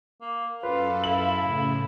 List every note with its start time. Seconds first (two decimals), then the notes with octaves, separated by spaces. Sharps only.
0.21 A#3
0.63 F#2 F4 A4 B4 F5
1.04 E4 F#7
1.38 A2 C#3